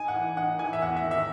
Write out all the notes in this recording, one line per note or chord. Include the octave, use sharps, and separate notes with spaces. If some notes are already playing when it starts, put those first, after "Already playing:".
Already playing: D#4 G#5
F#5
E3
D#4 F#5
E3 G#5
E5
E2 F#5
E5
D#3
E5